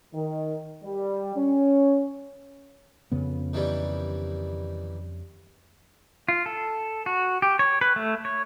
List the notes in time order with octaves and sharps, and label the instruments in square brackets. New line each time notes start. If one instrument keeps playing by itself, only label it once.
[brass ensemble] D#3
G3
C#4
[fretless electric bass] F2 C#3 B3
[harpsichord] D#3 E3 G3
[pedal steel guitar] F4
A4
F#4
G4
C#5
B4
A3
C#5